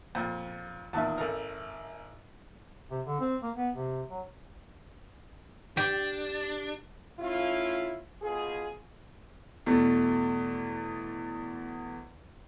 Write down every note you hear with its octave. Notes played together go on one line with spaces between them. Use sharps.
F2 A#2
E2 A#2 D#3 E5 A5
G#1 A4 A#4
C3
D3
C4
A#3
B3
C3
F#3
D4 G4
A3 C#4 E4 F4
B2 F4 G#4
E2 B2 A3